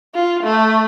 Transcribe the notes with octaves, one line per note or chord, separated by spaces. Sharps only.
F4
A3